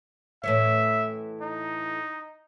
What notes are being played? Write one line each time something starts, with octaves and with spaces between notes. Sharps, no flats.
A2 E3 C#4 E5
D#4